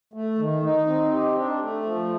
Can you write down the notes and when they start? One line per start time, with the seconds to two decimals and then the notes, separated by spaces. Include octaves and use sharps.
0.13 A3
0.38 D#3
0.63 D#4
0.87 C4
1.12 G4
1.37 D4
1.62 A3
1.85 F3